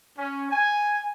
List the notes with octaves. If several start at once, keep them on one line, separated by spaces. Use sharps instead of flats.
C#4
G#5